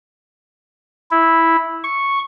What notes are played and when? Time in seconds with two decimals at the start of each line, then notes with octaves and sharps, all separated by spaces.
1.11 E4
1.84 C#6